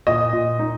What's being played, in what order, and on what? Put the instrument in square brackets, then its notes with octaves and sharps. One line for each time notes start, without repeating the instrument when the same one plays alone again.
[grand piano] A#2 [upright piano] D#5
[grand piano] A#2
D#4